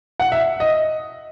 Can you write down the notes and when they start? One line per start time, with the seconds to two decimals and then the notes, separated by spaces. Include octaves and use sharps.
0.20 F#5
0.32 E5
0.60 D#5